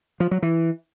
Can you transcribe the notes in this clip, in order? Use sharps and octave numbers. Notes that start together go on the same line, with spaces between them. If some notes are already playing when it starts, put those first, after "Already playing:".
F3
F#3
E3